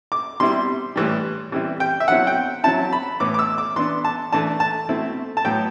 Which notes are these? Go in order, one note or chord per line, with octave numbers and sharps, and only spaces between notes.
D6
B2 G3 C4 E4 C6
A2 E3 G3
E3 G3 C4 E4
G5
E5
B2 F#3 C4 E4 F#5
G5
F#3 C4 E4 A5
B5
A2 E3 B3 D6
D6
E6
D6
E3 B3 D4 C6
A5
E3 A3 D4 A5
A5
B2 A3 C4 E4
A5
A2 F#3 B3 G5